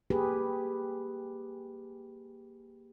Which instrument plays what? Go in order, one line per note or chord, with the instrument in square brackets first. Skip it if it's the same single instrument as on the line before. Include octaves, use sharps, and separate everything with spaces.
[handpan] A#3 G4 G#4 B4